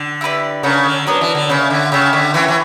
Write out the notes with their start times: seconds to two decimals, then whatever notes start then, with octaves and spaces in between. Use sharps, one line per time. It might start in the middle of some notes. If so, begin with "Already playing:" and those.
Already playing: D3
0.21 E4 G4 B4 D5
0.63 C#3 D4 F#4 A#4
0.85 D3
1.07 F#3 B3 D4 A#4 D5
1.21 E3
1.35 D3
1.49 C#3 A#3 C#4 E4
1.70 D3
1.92 C#3 G4 C#5 E5
2.13 D3
2.34 E3 C#4 E4 G4 C#5
2.48 E3